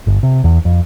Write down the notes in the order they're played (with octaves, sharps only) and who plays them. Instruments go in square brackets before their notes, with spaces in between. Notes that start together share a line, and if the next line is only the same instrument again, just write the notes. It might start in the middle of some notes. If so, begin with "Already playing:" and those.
[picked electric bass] G1
C3
E2
F2